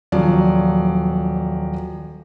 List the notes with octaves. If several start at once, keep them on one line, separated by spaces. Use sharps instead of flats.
D#1 F3 F#3 D5